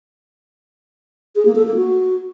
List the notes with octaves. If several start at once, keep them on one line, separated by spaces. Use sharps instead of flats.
G#4
A#3
A4
A#3
F#4